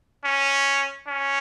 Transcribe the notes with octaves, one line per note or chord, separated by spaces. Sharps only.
C#4
C#4